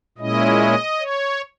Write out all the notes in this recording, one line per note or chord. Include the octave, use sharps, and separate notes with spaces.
A#2 G#3 C#4 E4 D#5
C#5